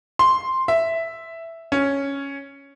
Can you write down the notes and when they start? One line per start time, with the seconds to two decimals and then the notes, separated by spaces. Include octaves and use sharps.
0.19 C6
0.68 E5
1.72 C#4